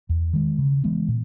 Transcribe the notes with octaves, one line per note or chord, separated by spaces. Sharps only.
E2
D#3 G#3
C#3
E3 G#3 B3
A#2